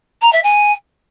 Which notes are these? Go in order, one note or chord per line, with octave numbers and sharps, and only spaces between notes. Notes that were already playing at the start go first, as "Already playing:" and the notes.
A#5
E5
G#5